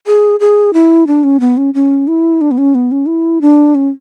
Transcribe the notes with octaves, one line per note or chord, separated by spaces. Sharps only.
G#4
G#4
E4
D4
C#4
B3
C#4
C#4
E4
D4
B3
C#4
B3
C#4
E4
D4
C#4